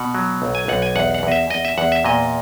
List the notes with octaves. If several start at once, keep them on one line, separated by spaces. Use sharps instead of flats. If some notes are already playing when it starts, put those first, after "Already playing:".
Already playing: B2 F#5
F#3
B1
G#5
B1 F#5
G#5
E2 F#5
F#5
E2 D#5
E5
E2 D#5
E5
E2 F#5
E5
A#2 D#5